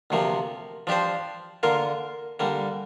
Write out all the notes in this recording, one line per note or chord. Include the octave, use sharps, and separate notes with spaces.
D2 C3 F3 A#3
F3 D4 G4 C5
D3 A#3 F4 A#4
D3 G3 A#3